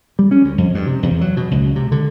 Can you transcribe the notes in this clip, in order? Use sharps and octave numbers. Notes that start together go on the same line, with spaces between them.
G3
C#4
D2
F2
G2
C3
E2
F#3
B2
C#2
C3
D3